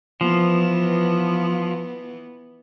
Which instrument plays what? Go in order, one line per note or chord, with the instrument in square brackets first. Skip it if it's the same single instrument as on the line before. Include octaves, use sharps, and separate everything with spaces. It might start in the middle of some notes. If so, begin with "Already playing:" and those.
[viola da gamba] E3 B3 [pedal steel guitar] F3